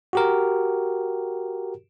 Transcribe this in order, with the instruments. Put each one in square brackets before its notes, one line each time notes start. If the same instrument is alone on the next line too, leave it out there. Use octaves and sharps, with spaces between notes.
[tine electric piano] F#4 G4 A#4